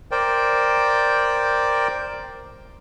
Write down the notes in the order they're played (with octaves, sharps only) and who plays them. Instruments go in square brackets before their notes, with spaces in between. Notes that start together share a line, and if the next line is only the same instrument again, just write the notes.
[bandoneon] A#4 C5 D5 G5